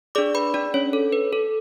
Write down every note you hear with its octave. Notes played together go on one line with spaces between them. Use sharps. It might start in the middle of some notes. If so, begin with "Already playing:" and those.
D4 G#4 D5 D6
B4 B5
D4 D5
C#4 C#5
A4
B4
A4